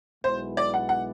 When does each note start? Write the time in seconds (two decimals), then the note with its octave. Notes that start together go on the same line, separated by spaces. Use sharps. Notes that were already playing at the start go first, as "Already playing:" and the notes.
0.23 B1 B2 G#3 B3 E4 C5
0.57 D5
0.74 F#5
0.89 F#5